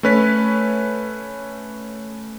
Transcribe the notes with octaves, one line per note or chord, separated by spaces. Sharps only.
A3 C#4 B4 C#5 B6